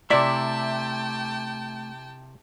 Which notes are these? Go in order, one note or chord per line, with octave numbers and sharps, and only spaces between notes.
C3 A3 E4 D5 E5 G5 A5